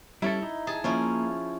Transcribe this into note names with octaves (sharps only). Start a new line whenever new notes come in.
G3 C#4 E4 A4
D#4
G#4 A5
F3 A#3 C#4 E4